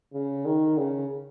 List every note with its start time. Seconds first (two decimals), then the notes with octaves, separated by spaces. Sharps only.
0.13 C#3
0.45 D#3
0.78 C#3